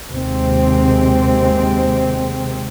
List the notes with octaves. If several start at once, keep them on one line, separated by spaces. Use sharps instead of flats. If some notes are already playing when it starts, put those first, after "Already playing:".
D#2 C3 G#3 C4